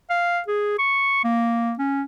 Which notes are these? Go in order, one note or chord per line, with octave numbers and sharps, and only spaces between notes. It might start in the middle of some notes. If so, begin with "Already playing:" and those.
F5
G#4
C#6
A#3
C#4